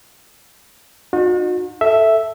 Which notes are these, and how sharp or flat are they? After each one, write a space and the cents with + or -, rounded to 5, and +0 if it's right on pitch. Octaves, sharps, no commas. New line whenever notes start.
D#4 -30 F#4 -40
A4 +0 E5 +0